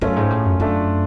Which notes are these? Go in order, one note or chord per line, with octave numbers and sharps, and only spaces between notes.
F#2 A3 C#4 F4
G#2
A2
F#2
F#2 A3 D4 F4